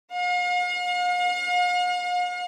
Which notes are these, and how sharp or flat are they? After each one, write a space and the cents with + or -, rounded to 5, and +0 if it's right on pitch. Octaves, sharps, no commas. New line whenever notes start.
F5 +45